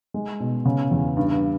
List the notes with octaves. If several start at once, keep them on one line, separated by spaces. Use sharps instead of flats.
G#3
B2
C#3
E2
G2